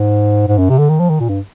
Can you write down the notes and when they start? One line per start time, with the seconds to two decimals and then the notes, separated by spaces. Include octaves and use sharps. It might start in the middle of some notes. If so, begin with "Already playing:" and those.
Already playing: G#2
0.48 G#2
0.58 F#2
0.69 C3
0.79 D3
0.89 D#3
1.00 F3
1.10 D#3
1.20 A#2
1.29 G2